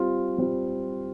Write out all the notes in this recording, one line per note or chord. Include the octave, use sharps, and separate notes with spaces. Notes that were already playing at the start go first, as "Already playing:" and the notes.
Already playing: G3 C4 F4
G3 C4 F4